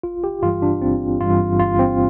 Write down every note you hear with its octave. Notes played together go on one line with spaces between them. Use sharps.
G1 F4
G4
G2 E3 G3 F4
D4
G1 C4
G2 E3 G3 F4
G1 F4
C4